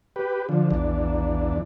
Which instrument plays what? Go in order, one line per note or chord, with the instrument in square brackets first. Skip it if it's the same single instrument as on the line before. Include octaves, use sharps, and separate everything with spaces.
[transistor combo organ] G4 B4
D3 F3
[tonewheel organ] A#1 [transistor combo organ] E2 D4